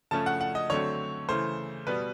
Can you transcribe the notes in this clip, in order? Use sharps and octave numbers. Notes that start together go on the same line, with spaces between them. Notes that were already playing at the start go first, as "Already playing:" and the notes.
C#3 F3 A3 C#4 A5
F#5
F#5
D#5
D3 F#3 A3 C4 C#5
C#3 E3 A3 C5
B2 G3 B3 B4